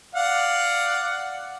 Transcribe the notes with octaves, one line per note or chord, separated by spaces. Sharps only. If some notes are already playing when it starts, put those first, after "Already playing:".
D5 F5 F#5